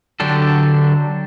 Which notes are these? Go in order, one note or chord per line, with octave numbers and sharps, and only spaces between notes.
D3 F#3 D4 G4 A4